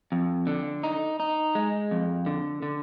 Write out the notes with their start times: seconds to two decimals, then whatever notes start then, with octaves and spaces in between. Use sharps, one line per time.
0.12 F2
0.47 D3
0.83 D#4
1.20 D#4
1.55 G#3
1.91 F2
2.26 D3
2.62 D3